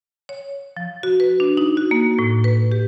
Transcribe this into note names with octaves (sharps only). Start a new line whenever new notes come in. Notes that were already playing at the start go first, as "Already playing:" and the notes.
C#5
F3
F#4
B4
D4
D#4
F#4
A#3
A2
B4
G4